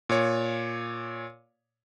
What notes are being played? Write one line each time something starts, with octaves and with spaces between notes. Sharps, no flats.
A#2 C#5